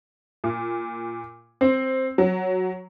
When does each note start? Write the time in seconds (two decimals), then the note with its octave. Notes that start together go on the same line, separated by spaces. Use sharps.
0.44 A#2
1.61 C4
2.18 F#3